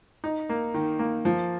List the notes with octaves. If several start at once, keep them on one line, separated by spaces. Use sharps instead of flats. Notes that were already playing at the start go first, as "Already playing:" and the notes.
D#4
A#3
D#3
A#3
F3